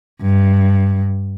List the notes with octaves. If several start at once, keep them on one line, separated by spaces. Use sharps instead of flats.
G2